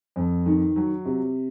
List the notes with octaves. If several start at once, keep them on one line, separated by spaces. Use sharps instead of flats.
F2
D#3
F#3
C3